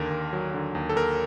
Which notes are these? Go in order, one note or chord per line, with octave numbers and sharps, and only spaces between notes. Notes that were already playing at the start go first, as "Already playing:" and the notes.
Already playing: D#2 D3 A#4
D#2
F#3
D3
D#2
A4
D#2 A#4